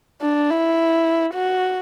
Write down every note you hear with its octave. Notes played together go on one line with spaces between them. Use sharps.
D4
E4
F#4